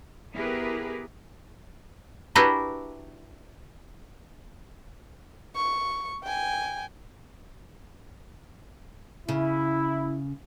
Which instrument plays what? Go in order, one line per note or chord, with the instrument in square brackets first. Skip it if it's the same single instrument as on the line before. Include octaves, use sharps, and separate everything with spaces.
[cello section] B3 E4 G4 G#4 A#4 B4
[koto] D4 E4 F#4 G4 A#4 B4
[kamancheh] C#6
G5 G#5
[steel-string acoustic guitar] C#3 [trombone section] E4